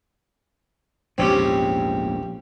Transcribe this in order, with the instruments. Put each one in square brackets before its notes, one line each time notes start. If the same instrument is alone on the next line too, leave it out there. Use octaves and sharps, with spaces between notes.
[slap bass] A#1 E2 G#2 [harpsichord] C4 C#4 G4